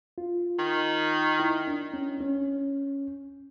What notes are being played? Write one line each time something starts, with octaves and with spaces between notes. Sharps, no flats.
F4
D#3
E4
D4
C#4
C#4